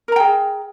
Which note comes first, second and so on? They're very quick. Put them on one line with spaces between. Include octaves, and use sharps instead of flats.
A#4 A#5 G5 G#4